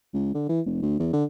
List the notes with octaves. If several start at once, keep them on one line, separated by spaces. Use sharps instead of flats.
C#2
D3
E3
F1
D2
E2
D3